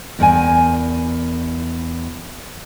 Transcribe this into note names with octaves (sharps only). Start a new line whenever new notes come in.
E2 A#4 D5 F#5 G#5